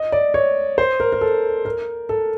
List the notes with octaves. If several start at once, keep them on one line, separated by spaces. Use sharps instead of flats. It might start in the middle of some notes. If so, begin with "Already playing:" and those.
Already playing: D#5
D5
C#5
C5
A#4
A#4
A4
A#4
A4